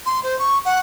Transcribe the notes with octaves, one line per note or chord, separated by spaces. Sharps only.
C6
C5
C#6
F#5